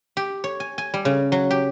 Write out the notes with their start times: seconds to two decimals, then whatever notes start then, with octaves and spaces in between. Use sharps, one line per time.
0.17 G4
0.44 C#5
0.60 G#5
0.78 G#5
0.94 G3
1.05 C#3
1.32 F#3
1.51 G4